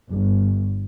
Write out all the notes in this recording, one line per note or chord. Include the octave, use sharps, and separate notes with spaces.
G1